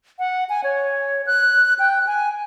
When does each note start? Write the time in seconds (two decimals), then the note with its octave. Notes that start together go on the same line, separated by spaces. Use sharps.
0.19 F#5
0.49 G#5
0.64 C#5
1.27 F#6
1.79 G5
2.07 G#5